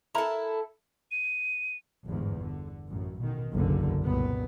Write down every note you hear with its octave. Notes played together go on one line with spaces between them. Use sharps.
E4 A4 A#4 A#5 B5
D#7
G1 E2 G#2
D3
A1 F#2
B2 D#3
F#1 B1 E2 D3
F#1 C2 A#2 B3